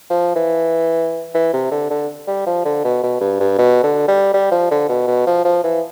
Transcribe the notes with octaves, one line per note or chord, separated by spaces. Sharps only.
F3
E3
E3
C3
D3
D3
G3
F3
D3
B2
B2
G2
G2
B2
D3
G3
G3
F3
D3
B2
B2
F3
F3
E3